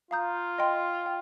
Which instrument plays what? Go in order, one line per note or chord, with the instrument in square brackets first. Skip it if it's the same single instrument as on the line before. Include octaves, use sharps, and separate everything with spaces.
[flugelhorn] F4 [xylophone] F5 A#5 D#6 G6
[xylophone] D#5 G5 C6
G5